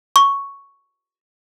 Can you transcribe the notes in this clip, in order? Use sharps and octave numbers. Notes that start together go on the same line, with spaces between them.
C#6